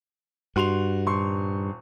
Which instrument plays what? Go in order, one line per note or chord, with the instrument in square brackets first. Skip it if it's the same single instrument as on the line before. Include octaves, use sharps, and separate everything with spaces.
[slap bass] G2 [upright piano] F#4 C6 F7
[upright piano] D#1 C6 C#6